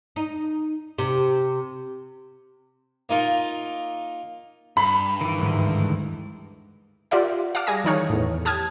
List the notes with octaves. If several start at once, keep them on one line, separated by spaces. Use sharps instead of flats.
D#4
C3
A#3 D#4 F4 A#4
G2 B5
D#3 E3
D2 G#2
F4 G4 A#4 D5 E5 F#5
F5 F#5 A5 D6 F6
G3 G#4 G#5 D#6 A#6
D#3 E3 D#4 C#5 F6
E2 A2
G4 A5 D#6 F6 G#6